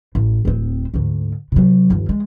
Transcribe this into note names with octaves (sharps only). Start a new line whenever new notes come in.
A1
D1 C4
D2 G#2
C3 F#3
G1 D#2
G#3